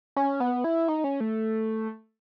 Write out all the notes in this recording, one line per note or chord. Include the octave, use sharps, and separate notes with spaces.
C#4
B3
E4
D#4
C#4
A3